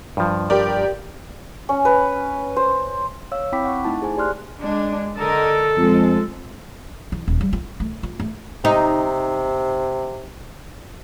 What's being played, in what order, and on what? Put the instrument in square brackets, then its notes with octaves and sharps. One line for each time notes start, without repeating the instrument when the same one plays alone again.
[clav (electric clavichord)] G2 F3
[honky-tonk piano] G4 A#4 D5
[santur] C#4
B4
C5
[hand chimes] C#5 F5 E6
C4 E4 G5 B5 D6 B6
F#5 C#6
A3 D#4 E4 A5
G#4 C5 G#5
G4 D5 C6 F6 F#6
[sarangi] G#3 [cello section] D4
[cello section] D3 A#4 D#5 [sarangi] A4
[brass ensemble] F2 [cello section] G#3
[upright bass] E3
D#1
G3
F4
A3
F4
A3
[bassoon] C3 [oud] D#4